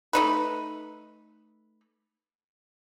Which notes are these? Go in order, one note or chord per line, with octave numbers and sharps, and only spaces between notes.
A3 D#4 B4